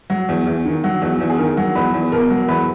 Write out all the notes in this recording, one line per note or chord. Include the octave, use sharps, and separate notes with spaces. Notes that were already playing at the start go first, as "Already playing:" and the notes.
F#3
E2
E2
D#3
F#3
E2 F#4
E2
G#4
D#3 A#4
F#3
E2 B4
E2
B2 A#4
F#3
E2 B4